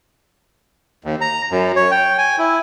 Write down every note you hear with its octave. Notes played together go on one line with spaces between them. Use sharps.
D#2
A#5
F#2
C#5
G5
G#5
E4